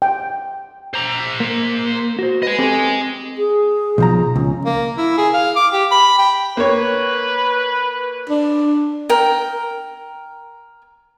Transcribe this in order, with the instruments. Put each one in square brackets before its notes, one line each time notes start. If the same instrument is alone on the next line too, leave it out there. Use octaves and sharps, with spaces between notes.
[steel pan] G5
[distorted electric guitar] C5 A#5
[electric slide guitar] A#3
F#4 C5
[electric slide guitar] B4 [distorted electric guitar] D#5 G#5
[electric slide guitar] C4 G4 A4
[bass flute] G#4
[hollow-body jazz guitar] B1 F3 A#5
[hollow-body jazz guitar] C#2 [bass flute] C#4
[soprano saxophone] A#3
E4
G#4
F5
D6
G4
B5
G5
[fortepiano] A#3 C#5 [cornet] B4
[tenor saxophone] D4
[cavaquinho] A#4 G5